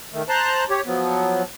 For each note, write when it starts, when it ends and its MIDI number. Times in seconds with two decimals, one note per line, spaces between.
0.13 0.22 51
0.13 0.22 57
0.29 0.64 72
0.29 0.64 81
0.29 0.64 82
0.29 0.64 84
0.29 0.64 90
0.70 0.81 67
0.70 0.81 73
0.86 1.43 53
0.86 1.43 54
0.86 1.43 59